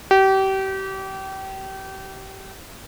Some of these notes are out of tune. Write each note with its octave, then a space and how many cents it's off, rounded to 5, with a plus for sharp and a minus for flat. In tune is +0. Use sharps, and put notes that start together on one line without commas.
G4 -30